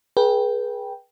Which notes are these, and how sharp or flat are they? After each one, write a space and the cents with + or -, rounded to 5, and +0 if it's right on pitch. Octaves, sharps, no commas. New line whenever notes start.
G#4 +15 B4 -30 G5 +0